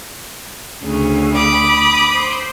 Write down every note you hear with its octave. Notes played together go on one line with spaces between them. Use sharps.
D2 C#3
B5 D6 D#6
C5